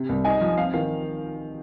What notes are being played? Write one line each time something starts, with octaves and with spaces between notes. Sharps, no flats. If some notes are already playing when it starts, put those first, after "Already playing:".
Already playing: C3
C2
D#4 G#5
F3
C4 F5
D#3 F5